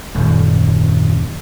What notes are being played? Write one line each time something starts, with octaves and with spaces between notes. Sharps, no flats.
D#1 F#2